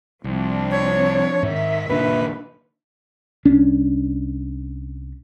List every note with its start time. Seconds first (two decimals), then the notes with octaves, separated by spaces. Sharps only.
0.24 C2 F3 C4 D4
0.71 C#5
1.43 G#2 D#3 E5
1.89 F#1 A#2 D4 B4
3.45 C2 C#4 D4